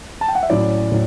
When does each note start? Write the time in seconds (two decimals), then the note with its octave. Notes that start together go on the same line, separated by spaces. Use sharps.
0.21 A5
0.28 G5
0.35 F#5
0.43 E5
0.49 A2 F#3 C#4 E4 D5
0.92 A2 F#3